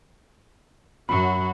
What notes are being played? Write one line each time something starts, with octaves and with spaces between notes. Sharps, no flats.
F#2 F#3 F#4 B5